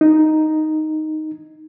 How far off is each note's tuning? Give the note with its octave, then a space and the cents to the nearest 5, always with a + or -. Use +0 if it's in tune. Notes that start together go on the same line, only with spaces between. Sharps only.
D#4 +0